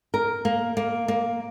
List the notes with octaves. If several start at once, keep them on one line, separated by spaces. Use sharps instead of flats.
A#4
A#3
A#3
A#3